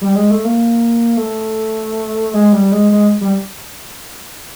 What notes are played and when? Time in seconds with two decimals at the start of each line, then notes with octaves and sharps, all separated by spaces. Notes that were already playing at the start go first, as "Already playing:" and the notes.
0.01 G3
0.15 G#3
0.31 A3
0.45 A#3
1.17 A3
2.34 G#3
2.53 G3
2.72 G#3
2.92 G#3
3.21 G3